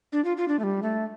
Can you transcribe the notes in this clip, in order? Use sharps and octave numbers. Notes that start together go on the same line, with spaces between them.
D4
F4
F4
D4
A3
G3
A3